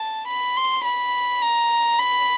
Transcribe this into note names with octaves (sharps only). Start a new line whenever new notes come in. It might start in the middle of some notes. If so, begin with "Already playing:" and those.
Already playing: A5
B5
C6
B5
A#5
B5